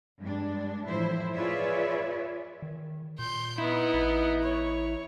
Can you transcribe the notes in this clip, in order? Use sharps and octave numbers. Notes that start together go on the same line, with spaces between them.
G2 G#3 D4
A2 E3 F3 E4 C5
F4 G#4 B4 C#5 D5 E5
D#3
A#2 C6 G6
B3 D#4 E4
A1
C#5